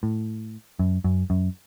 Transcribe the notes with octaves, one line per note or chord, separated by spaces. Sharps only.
A2
F#2
F#2
F#2